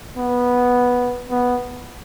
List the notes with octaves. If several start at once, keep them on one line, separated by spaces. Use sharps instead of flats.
B3
B3